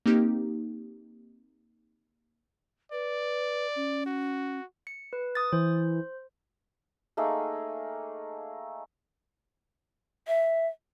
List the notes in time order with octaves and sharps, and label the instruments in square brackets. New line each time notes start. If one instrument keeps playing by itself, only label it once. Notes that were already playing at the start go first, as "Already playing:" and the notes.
[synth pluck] A#3 C4 D#4 G4
[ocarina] B4 [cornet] D5
[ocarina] C#4
[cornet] F#4
[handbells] C#7
B4
D#6 A6
[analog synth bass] E3 [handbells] C5
[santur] A3 A#3 D#4 G#4
[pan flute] E5